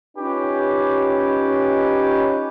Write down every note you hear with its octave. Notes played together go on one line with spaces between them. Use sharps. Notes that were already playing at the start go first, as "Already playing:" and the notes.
C#4 D#4 F4 G4 B4 C#5